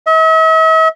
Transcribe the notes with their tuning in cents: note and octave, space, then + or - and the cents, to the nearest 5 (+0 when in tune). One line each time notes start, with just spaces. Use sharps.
E5 -45